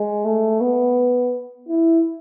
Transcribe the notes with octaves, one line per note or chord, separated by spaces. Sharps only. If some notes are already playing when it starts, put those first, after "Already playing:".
Already playing: G#3
A3
B3
E4